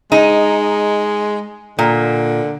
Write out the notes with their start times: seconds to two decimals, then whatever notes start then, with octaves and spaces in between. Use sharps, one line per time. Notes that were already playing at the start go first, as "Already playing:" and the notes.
0.12 G#3 D#4
1.79 A#2 D3